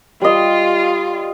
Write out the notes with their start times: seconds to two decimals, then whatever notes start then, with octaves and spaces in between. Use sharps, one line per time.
0.21 G3 F4 D#5